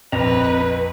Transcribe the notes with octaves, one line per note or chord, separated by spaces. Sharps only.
A#1 F2 C4 B4 D#5 A#5